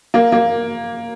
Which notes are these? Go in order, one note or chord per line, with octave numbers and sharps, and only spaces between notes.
A#3
A#3